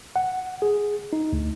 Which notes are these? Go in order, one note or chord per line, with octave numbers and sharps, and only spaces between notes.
F#5
G#4
D#4
D2